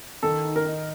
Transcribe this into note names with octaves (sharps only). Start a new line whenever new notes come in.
D#3 A4
D#4
A#4
D#4